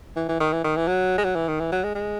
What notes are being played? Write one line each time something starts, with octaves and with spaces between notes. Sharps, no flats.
E3
E3
D#3
E3
D#3
E3
F#3
G#3
F#3
E3
D#3
E3
F#3
G#3
G#3